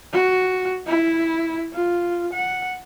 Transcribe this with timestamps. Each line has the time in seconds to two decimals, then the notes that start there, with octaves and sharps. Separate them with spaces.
0.13 F#4
0.86 E4
1.73 F4
2.33 F#5